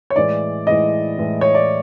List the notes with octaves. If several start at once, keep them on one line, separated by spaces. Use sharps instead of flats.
C#5
A2 E3 G#3 D5
A2 E3 G#3 D#5
A2 E3 G#3
C#5
D5